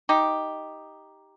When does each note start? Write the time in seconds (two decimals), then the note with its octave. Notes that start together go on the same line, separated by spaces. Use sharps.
0.09 D#4 G4